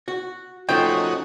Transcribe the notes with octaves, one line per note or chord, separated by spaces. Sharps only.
F#4
F3 A3 C#4 D#4 F#4 G5